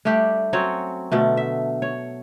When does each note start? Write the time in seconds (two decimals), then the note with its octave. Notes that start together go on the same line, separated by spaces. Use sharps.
0.05 G3 A3 D4 G4
0.53 F#3 C4 C#4 C#5
1.12 B2 D3 A3
1.37 E5
1.82 C#5